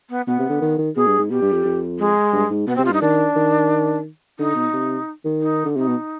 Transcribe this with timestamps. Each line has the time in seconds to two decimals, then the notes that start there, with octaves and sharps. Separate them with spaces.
0.09 B3
0.27 B2 B3
0.39 C3
0.49 D3
0.62 D#3
0.78 D#3
0.96 B2 G#4
1.07 G2
1.19 G#2
1.30 B2 G4
1.41 G2
1.53 F2
1.65 F2
1.99 G#3
2.32 G2
2.50 G#2
2.67 B2 B3
2.76 C4
2.78 C3
2.85 F4
2.90 G2
2.93 D#4
3.02 D#3 D4
3.36 D#3
4.39 D3 D#4
4.55 B2
4.73 C3
5.25 D#3
5.41 D#4
5.65 D3
5.76 C3 D#4
5.87 B2